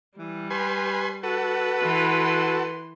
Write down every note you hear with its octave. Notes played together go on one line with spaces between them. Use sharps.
E3 G3
G4 B4 G#5 C6
F#4 A4 B4
E3 C6